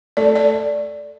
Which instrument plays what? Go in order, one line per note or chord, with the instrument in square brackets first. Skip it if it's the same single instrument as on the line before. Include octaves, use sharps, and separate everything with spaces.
[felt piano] A3 [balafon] D5
[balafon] D5